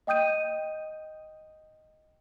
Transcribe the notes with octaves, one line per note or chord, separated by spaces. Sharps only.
D#5 G5 D#6 G6 D#7